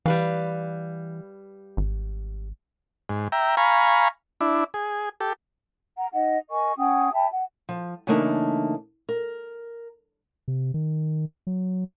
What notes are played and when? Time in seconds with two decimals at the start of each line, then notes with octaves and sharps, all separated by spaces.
0.06 E3 G3 B4 F5
1.77 G#1
3.09 G#2
3.32 E5 G5 A#5
3.57 F5 G#5 A#5 B5 C#6
4.41 D4 E4
4.74 G#4
5.20 G4 A4
5.98 F#5 A#5
6.13 D#4 D#5 F#5
6.50 A#4 D#5 G#5 C#6
6.77 C#4 F#5 G5 D#6
7.14 E5 G5 A5 B5
7.32 F#5
7.69 F3
8.07 C#3 E3 A3 A#3 D4 D#4
9.09 A#4
10.48 C3
10.74 D#3
11.47 F#3